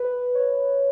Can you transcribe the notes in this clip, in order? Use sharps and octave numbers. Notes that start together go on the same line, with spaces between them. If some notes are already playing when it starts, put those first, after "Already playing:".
Already playing: B4
C#5